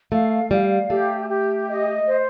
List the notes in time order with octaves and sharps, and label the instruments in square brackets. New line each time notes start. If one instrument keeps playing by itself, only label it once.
[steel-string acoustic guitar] A3 [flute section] F5
[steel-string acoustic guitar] G3 [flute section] F5
[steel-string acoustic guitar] A3 [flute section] G4
[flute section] G4
D#5
C5